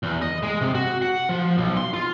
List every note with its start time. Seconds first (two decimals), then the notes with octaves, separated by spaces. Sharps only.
0.03 E2
0.22 D#5
0.43 G#3
0.61 C3
0.75 F#4
1.02 F#5
1.29 F3
1.58 B1
1.77 C6
1.94 F4